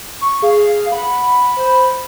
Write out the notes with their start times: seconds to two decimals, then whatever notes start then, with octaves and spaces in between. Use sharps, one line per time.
0.21 C#6
0.42 G#4 F5
0.92 F#5 B5
1.56 C5